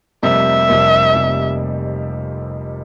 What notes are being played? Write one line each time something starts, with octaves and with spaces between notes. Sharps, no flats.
F1 F2 C3 G3 A#3 E5
F1 F2 C3 G3 A#3
F1 F2 C3 G3 A#3